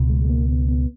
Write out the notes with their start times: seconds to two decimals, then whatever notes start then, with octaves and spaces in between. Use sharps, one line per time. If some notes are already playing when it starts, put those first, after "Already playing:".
Already playing: C#2 B2
0.10 G#3
0.24 G#3
0.29 A#3
0.49 B3
0.68 B3